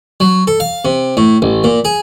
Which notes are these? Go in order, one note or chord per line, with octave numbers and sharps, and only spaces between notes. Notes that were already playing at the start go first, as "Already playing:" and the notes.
F#3
A4
F5
C3
A2
A1
A#2
G#4